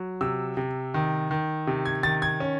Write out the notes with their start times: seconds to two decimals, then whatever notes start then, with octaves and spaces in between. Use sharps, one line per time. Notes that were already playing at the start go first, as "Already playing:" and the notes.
Already playing: F#3
0.21 C3 E6
0.57 C3
0.94 D#3
1.31 D#3
1.67 C3
1.85 G#6
2.03 D#3 A6
2.22 G#6
2.40 C#4